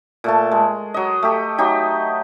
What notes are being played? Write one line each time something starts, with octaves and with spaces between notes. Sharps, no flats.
A#2 A3 A5
G#3
F#3 D#5
A3 G4
F#3 D#4 G4